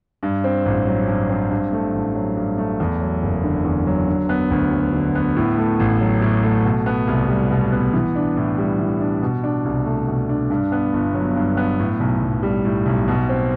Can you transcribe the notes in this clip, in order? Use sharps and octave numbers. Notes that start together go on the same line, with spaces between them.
G2
C4
A1
F#3
G2
C4
G2
A3
A1
F#3
G2
A3
E2
F#3
F#1
D3
E2
F#3
D3
B3
D2
F#3
D3
B3
A2
A3
A1
F#3
A2
A3
B2
B3
C2
G3
B2
B3
E3
D4
A2
G3
E3
D4
B2
D4
C2
A3
B2
D4
G2
B3
G1
F#3
G2
B3
A2
B1
B1
G3
A2
B1
B2
C4